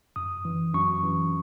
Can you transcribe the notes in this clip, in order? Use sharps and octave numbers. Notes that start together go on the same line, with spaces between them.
F#2 D#6
E3
F#2 C#6
E3